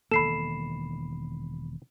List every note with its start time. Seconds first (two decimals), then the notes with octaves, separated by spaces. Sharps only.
0.11 E1 D#3 A#3 A4 B5 C7 E7